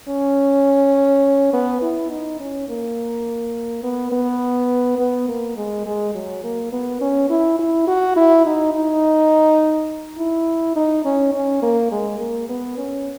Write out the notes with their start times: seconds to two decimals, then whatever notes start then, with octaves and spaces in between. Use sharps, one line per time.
0.09 C#4
1.53 B3
1.82 E4
2.10 D#4
2.40 C#4
2.69 A#3
3.84 B3
4.12 B3
4.99 B3
5.28 A#3
5.57 G#3
5.86 G#3
6.14 F#3
6.43 A#3
6.72 B3
7.01 C#4
7.30 E4
7.59 E4
7.87 F#4
8.16 E4
8.46 D#4
8.74 D#4
10.18 E4
10.76 D#4
11.05 C#4
11.34 C#4
11.62 A#3
11.92 G#3
12.20 A#3
12.49 B3
12.78 C#4